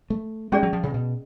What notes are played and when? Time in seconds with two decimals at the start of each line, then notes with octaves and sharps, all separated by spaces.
0.10 A3
0.52 G#3 C#4 G#4 D5
0.63 F#3
0.73 F3
0.83 C#3
0.94 B2